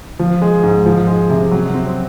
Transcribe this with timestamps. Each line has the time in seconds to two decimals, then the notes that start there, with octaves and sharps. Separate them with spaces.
0.19 F3
0.42 G#3
0.63 G#2
0.86 F3
1.07 G#3
1.30 C3
1.52 F#3
1.74 C4